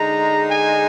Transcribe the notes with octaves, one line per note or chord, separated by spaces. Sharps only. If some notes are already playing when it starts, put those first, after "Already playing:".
Already playing: D3 G#3 D#4 A#5
G#5